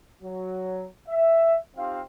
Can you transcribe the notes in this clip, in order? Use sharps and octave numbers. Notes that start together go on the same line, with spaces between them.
F#3
E5
C4 D#4 F4 G4 F5